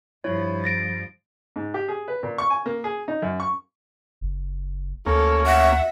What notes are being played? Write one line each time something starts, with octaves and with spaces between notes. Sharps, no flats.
G2 F3 E4 C#5
A6 A#6 D7
G#2
G4
G#4
B4
A#2
C#6
G#5
A#3
G#4
D#4
F#2
C#6
F#1
D2 A#3 C#4 A4
E5 F#5